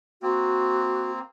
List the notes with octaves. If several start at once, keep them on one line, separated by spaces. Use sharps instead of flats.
A#3 C4 F#4